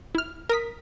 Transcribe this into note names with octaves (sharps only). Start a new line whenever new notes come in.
E4 F6
A#4 D#6 B6